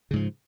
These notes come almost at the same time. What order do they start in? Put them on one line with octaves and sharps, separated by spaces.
C#3 G#2 F3